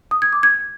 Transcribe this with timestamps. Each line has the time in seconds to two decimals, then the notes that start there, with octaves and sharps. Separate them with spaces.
0.11 D#6
0.22 G#6
0.33 D6
0.43 G#6